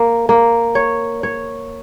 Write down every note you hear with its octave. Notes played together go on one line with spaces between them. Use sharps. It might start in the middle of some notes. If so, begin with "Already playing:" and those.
Already playing: A#3
A#3
C#5
C#5